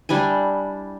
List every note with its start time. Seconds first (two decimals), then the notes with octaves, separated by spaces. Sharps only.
0.09 G3 D4 E4 G#5